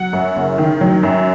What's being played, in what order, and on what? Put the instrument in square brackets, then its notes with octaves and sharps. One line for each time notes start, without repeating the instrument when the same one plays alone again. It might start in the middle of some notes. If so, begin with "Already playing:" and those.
Already playing: [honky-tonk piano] F#3 F#5
F#2
F#1
D#3
F#3
F#2